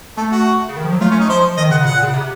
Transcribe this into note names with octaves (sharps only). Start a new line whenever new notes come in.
A3 A4
F#4
C#3
D#3
F3
F#3
A3 F4
C#4
D#4
F3 C5
D#3 D#5
C#3 F#5
A#2 F#5
C#3
C3